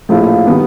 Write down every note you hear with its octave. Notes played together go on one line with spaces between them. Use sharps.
A#1 A2 F3 A3
D#3 G3 B3